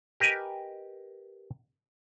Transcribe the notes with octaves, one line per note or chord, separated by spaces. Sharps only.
G4 A#4 B4 D#5 G#5